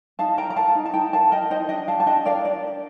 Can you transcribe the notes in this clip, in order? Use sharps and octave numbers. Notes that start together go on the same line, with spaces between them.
D#4 F5 A5
A#4 G5 A#5
A#5
A#4 F5 A5
D#4
A5
D#4 G5 A#5
A#4 F5 A5
A#4 D#5 G5
D#4 C5 D#5
D4 D#5 G5
G4 F5 A5
A5
D4 D#5 G5
A#4 D5 F5
D4 D5
G4